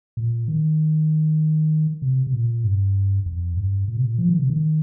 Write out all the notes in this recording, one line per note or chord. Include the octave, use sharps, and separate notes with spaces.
A#2
D#3
C3
C3
A#2
G2
F2
G2
A#2
C3
A#2
F3
D#3
C3
D#3